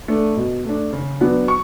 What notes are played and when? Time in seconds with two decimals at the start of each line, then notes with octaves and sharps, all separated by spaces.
0.08 A3 D4
0.37 B2
0.65 A3 D4
0.93 C#3
1.21 F#3 B3 D4
1.48 C#6